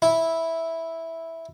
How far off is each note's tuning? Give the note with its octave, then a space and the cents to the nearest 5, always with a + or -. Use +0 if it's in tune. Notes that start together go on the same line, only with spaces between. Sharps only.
E4 -5